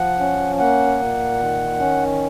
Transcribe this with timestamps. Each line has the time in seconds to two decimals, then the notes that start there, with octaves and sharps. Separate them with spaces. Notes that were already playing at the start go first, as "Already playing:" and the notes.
Already playing: F3 F#5
0.20 C#4
0.60 A#3 F#5
1.00 A#2
1.40 D#3
1.80 C#4